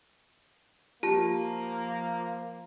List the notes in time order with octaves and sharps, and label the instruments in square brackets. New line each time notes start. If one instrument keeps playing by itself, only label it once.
[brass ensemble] F3 A#3 [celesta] F4 [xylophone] G4 A5